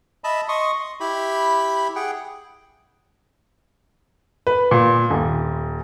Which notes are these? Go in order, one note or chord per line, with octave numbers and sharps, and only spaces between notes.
D#5 E5 A5 B5
D#5 C6 C#6 D#6
C6
E4 G4 B5
G#4 F#5 G5
B4
A#2
D#1